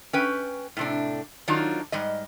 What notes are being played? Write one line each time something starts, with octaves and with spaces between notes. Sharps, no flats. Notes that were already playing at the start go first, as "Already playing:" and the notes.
C#4 B4 G5
A2 C3 D4
D#3 F#3 D4 D#4 F4
G#2 G3 D#5